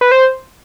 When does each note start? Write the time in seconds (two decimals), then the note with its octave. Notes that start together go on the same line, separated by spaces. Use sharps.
0.01 B4
0.12 C5